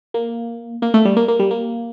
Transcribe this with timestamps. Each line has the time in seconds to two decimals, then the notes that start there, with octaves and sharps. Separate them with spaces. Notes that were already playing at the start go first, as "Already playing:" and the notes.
0.14 A#3
0.82 A#3
0.94 A3
1.05 G3
1.17 A#3
1.28 A#3
1.39 G3
1.51 A#3